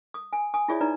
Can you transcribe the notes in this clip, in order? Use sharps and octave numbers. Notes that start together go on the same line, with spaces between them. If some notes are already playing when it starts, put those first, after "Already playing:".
D#6
G#5
G#5 D#6
E4 F4 G#4 C#5 D5 E5
D#4 B4 D5 A#5